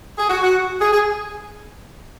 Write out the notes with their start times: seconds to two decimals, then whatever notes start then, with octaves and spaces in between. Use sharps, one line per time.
0.18 G#4
0.30 F#4
0.43 F#4
0.81 G#4
0.93 G#4